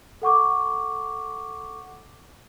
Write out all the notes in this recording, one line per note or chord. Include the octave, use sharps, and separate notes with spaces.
A4 F#5 C#6 D6